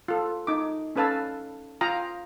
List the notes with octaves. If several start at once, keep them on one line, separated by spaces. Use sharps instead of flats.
F4 A4
D#4 D6
C#4 A4 B4 F5 A5 E6
F4 F5 G5 A#5 D#6